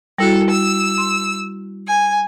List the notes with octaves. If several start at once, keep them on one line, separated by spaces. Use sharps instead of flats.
G3 E4 F#4 A4
E6
C6
G#5